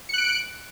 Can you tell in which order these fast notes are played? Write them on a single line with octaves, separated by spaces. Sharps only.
C#7 F#6 D7